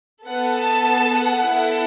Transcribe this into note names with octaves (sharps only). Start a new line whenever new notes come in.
B3 A4 F#5
A5
A5
F#5
B3 E4 A4